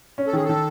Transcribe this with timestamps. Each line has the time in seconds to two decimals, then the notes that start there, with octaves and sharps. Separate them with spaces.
0.18 C#4
0.27 A4
0.33 D#3 G#4
0.45 D#3 A4